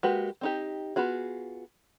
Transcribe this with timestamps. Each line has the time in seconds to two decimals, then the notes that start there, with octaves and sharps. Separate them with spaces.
0.03 G#3 A#3 F#4 G4 B4
0.41 C4 D#4 G4
0.96 B3 F4 F#4 G#4